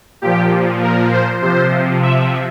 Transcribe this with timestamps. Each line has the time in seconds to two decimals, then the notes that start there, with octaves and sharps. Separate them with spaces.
0.22 A#2 F3 G4
0.82 A#4
1.11 C5
1.42 C3 F3 C5
2.02 E5